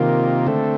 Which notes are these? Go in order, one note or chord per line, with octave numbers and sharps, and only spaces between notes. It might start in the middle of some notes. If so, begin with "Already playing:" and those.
Already playing: C3 D#3 A#3 F4
D3 A3 C4